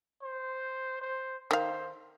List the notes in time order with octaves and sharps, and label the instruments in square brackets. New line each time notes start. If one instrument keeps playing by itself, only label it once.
[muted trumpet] C5
C5
[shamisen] D#3 F5 [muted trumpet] C5